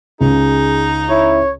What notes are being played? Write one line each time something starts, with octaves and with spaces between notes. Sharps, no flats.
C#2 D#4 G#4
E4 C#5